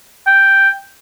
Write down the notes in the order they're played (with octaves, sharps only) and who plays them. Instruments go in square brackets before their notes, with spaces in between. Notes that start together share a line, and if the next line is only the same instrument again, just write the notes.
[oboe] G5